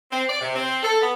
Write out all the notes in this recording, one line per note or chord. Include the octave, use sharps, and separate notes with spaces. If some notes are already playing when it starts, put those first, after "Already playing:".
C4
D5
C3
C4
A4
B3